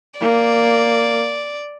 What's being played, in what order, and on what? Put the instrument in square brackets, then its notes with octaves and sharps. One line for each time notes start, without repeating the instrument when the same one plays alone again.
[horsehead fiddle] A#3 [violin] D5